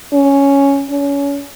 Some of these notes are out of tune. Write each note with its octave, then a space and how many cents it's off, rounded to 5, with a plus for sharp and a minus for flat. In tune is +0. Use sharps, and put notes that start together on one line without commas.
C#4 +5
C#4 +30